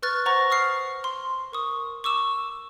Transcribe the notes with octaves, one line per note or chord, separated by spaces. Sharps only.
B4 C#6 F6 F#6 A6
C5 F#5 A#5 C#6 A#6
C#6 D#6 F6 C7 C#7
C6
A#4 C#6 D#6
C#6 D6 E6 E7